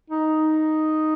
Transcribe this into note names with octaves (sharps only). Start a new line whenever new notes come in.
D#4